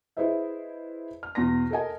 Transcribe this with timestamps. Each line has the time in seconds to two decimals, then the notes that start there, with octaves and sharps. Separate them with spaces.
0.17 E4 G#4 B4 C5 D#5 E5
1.23 F6
1.35 E2 B2 C6 A#6
1.70 A4 A#4 D#5 G#5